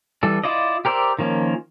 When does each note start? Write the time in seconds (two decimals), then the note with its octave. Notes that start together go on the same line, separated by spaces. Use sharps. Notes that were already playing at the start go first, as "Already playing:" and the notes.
0.23 E3 G3 A4
0.44 E4 F4 D5 D#5
0.85 G4 A#4 C5 D5 E6
1.19 D#3 F3 A#3 C#4